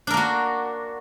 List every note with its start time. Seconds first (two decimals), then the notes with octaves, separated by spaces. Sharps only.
0.07 D4
0.10 A#4
0.14 A#3
0.17 F#4